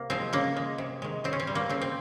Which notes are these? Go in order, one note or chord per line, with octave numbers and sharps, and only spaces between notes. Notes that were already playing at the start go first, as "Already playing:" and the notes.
Already playing: C3 A#3
F3 G#3 C4
C#3 A#3
G#3
C3
D#3 G#3
C#3 C4
C#4
C4
G3
A#3
C#3 C4
C4